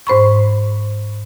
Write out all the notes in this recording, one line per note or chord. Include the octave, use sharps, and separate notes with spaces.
G#2 C5 B5 C#6